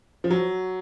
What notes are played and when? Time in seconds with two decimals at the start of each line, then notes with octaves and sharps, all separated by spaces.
0.24 F3
0.30 F#3